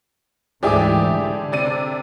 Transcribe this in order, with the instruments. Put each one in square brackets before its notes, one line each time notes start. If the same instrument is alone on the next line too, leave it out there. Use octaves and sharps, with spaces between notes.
[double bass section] D2 G#2 E3 [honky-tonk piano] E4 G4 D5 [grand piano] G#4 D6
[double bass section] D3
[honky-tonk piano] C3 D5 D#7